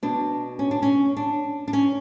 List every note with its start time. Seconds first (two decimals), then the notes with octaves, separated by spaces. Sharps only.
0.03 B2 D4
0.59 C#4
0.71 D4
0.82 C#4
1.17 D4
1.68 D4
1.73 C#4